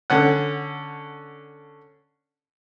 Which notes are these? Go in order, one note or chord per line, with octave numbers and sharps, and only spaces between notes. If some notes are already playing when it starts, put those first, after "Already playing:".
D3 C#4 F#5